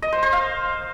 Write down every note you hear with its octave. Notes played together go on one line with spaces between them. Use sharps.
D#5
C5
C5
F5